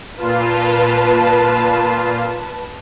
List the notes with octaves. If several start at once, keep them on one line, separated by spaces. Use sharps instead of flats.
A#2 F4 B4 A5